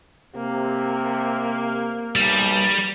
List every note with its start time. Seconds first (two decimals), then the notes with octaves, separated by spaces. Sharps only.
0.36 C3 A#3
2.16 B1 G3